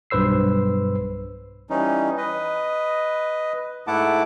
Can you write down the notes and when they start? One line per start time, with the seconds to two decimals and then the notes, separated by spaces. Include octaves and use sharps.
0.10 B1 G2 B4 C5 E6 C7
1.70 E3 G3 C#4 D#4
2.17 B4 D#5
3.87 G#2 A3 E4 F#5 A5 D6